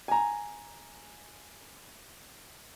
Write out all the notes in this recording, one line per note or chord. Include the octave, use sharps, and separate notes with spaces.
G#5 A#5